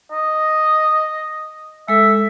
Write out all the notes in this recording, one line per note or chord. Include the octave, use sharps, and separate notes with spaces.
D#5
G#3 A4 E5